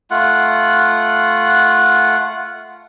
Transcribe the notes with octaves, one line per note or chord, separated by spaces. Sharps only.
A3 F4 F#5